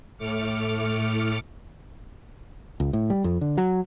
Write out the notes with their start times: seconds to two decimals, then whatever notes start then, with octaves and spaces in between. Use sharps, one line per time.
0.17 A2 A3 D6 F6 C#7
2.80 C#2
2.93 A2
3.10 G3
3.24 F2
3.41 D3
3.58 F#3